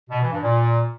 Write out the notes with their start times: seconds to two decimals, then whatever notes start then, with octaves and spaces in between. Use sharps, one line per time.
0.09 B2
0.20 E3
0.31 G2
0.42 A#2